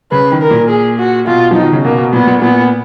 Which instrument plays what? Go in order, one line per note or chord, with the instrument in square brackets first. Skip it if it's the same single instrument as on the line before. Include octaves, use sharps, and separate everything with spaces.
[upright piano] C#3 [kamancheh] B4
[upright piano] D#3
[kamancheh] A#4
[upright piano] A#2
[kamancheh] G#4
F#4
[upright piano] B2 [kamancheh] F4
[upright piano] F3 [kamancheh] D#4
[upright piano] D#3
C#3
[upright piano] B2 [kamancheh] A#3
[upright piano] B2
[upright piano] A#2 [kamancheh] B3
[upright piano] A#2
[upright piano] A#2 [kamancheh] B3